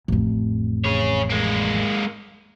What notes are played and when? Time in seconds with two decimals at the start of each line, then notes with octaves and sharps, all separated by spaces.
0.08 A1 F2
0.85 G#4 C#5
1.30 G#3 A#3